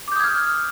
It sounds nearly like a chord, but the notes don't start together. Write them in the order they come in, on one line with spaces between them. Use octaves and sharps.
D6 G6 D#6 G#6 F6